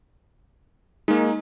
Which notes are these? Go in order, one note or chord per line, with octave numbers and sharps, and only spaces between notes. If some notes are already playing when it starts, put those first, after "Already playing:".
G#3 A#3 D#4